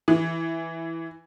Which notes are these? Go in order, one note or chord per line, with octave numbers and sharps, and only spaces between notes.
E3